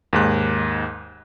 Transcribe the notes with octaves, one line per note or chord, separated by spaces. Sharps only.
D#2 G#2 F#6